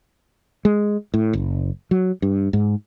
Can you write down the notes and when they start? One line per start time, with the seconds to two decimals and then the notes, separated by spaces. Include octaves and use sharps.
0.65 G#3
1.14 A2
1.33 F#1
1.91 F#3
2.22 G2
2.53 G#2